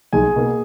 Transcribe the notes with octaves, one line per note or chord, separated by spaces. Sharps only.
B1 G#4 G#5
B2 A#3